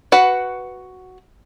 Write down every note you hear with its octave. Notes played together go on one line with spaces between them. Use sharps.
F#4 B4 F#5